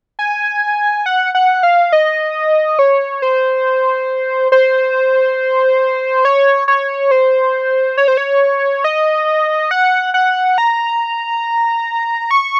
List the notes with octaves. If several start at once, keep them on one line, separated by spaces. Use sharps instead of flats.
G#5
F#5
F#5
F5
D#5
C#5
C5
C5
C#5
C#5
C5
C#5
C5
C#5
D#5
F#5
F#5
A#5
C#6